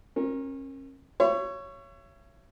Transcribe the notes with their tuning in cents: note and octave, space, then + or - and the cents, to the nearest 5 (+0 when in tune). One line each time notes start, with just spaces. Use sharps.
C#4 -35 A#4 +0
F#4 +40 C#5 +0 E5 +40